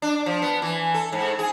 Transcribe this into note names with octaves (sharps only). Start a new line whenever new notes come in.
D4
F3
B3
E3
A4
G#2
G#4